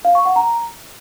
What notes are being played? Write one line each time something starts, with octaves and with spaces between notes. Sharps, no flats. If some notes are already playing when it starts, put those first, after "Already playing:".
F5
C#6
F#5
A#5